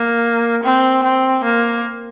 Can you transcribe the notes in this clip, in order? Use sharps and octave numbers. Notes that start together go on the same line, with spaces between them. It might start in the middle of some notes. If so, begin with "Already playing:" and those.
Already playing: A#3
C4
C4
A#3